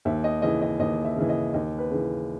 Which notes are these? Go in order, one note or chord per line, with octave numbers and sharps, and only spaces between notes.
D#2 E5
D#5
C#3 E3 D#5
D#5
D#2 D#5
E5
C#3 E3
D#5
D#2 D#5
B4
C#3 E3